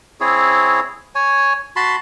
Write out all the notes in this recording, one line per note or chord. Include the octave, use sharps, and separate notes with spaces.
C4 E4 G#4 C#5
C#5 G#5
F#4 A5 B5 C6